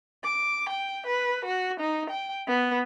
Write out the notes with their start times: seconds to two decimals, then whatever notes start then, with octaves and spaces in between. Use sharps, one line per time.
0.24 D6
0.69 G5
1.06 B4
1.45 F#4
1.80 D#4
2.10 G5
2.48 B3